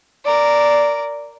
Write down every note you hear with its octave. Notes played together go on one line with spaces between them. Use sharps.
A#4 D5